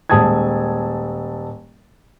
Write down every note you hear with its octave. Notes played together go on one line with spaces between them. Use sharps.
D#1 G#3 A5 D#6 G#6